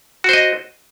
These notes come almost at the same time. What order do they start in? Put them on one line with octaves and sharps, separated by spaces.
F#4 C5 D#5